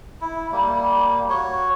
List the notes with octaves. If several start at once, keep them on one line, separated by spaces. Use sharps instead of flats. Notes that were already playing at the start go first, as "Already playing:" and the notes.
E4
G3 A#3
F#4 C#5